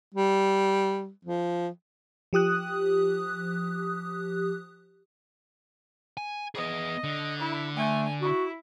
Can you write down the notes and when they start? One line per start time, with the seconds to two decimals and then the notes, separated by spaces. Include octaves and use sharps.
0.15 G3
1.25 F3
2.33 F3 G4 D#6 F#6
6.17 G#5
6.55 B3 G#4 D#5
7.04 D3
7.38 E4
7.76 A3 G#5
8.22 E4 F#4